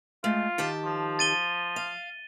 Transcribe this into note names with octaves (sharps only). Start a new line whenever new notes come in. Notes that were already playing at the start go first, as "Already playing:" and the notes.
G#3 A3 F4
D#3 G4 A5
F3
A6 D#7 G7
F5